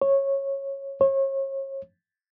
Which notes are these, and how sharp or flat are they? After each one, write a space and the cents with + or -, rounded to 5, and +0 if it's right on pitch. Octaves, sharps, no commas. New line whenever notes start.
C#5 -15
C#5 -35